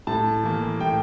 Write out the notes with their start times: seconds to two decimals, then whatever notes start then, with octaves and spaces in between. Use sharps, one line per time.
0.07 A2 A5
0.43 E3 A#3
0.80 A2 G5